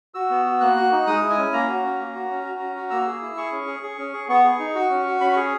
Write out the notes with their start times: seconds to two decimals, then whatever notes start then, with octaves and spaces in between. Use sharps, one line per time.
0.14 F#4 E6
0.30 B3
0.46 F#4
0.61 A#3 F#6
0.77 F#4
0.92 D#4
1.07 G#3 D#6
1.22 E4
1.30 G#5
1.38 C#4
1.52 A#3 A#5
1.68 F#4
1.84 C#4
1.99 A#3
2.15 F#4
2.30 C#4
2.45 F#4
2.60 C#4
2.76 F#4
2.90 A#3 E6
3.07 G#4
3.22 E4
3.36 G#4 C#6
3.52 C#4
3.67 G#4
3.83 G#4
3.98 C#4
4.13 G#4
4.28 B3 C#6
4.44 G#4
4.59 D#4
4.75 F#4
4.90 C#4
5.06 F#4
5.20 C#4 B5
5.32 G#4 C#6